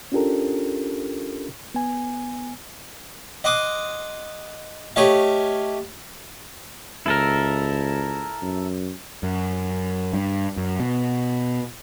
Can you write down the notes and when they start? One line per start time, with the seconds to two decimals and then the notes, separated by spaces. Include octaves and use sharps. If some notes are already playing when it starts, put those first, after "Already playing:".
0.12 C#4 D4 F4 G4 A4 A#4
1.74 B3 G#5
3.44 D#5 F#5 C6 D6 D#6
4.96 A3 G4 C#5 D#5 F5
7.06 C#2 E4 A4 A#4
8.42 F#2
9.23 F#2
10.13 G2
10.57 F#2
10.80 B2